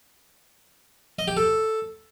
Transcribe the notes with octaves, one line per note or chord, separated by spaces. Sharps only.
D#5
G4
A4